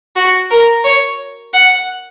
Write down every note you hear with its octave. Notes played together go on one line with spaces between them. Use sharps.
F#4
A#4
C#5
F#5